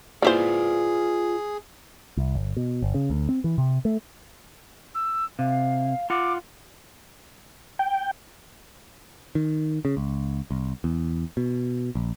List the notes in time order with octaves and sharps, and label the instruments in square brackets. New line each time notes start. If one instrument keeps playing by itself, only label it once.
[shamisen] A#3 E4 C5 [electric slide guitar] F4 B4 D5 [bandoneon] G#4
[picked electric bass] C2
G1
B2
G1
C#3
D2
C4
E3
C3
A3
[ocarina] E6
[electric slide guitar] C3 [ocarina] F5
[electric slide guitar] F4 F#5 [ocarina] D6
[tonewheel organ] G5
[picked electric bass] D#3
C#3
C#2
C2
E2
B2
A#1